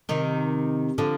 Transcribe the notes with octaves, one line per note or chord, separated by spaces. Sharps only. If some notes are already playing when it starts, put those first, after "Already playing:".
C3 D#3
D3 F3